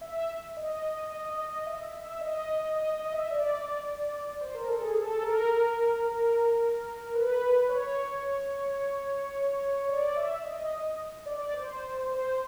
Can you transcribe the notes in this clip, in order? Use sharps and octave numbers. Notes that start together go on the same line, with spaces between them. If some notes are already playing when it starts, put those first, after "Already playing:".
E5
D#5
D#5
D#5
D#5
E5
E5
E5
D#5
D#5
D#5
E5
D5
D5
C5
A#4
A4
G#4
A4
A#4
A#4
B4
C#5
D5
E5
E5
D#5
D5
C5
C5